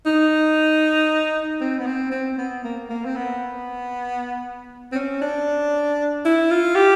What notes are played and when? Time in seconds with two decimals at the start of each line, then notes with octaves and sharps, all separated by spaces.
0.06 D#4
1.61 C4
1.79 B3
1.86 C4
2.12 C4
2.38 B3
2.64 A#3
2.90 A#3
3.05 C4
3.16 B3
4.92 C4
4.95 C#4
5.21 D4
6.25 E4
6.51 F4
6.76 G4